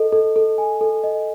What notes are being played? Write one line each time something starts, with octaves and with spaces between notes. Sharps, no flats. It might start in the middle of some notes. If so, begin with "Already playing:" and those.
Already playing: A4 D#5
A4
A4
G#5
A4
D#5